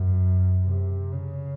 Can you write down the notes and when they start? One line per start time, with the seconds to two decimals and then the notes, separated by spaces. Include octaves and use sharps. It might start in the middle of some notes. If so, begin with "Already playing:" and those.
Already playing: F#2
0.65 C3
1.12 C#3